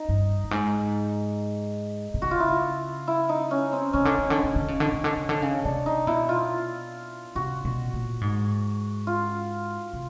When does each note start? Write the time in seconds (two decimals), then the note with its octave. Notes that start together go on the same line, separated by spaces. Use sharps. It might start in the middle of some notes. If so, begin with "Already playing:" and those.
Already playing: D#4
0.09 G2
0.44 G2
0.51 G#2
2.14 C3
2.22 C#3 F#4
2.31 F4
2.40 E4
2.48 F4
3.08 E4
3.29 D#4
3.51 C#4
3.73 C4
3.93 C#3 C#4
4.05 D3
4.18 C#3
4.30 D3
4.44 C#3
4.56 D3
4.68 C#3
4.80 D3
4.92 C#3
5.04 D3
5.17 C#3
5.29 D3
5.42 C#3
5.65 C3 D4
5.86 D#4
6.07 B2 E4
6.29 F4
7.35 C3 F#4
7.65 B2
7.94 A#2
8.21 G#2
9.07 F4
9.93 C3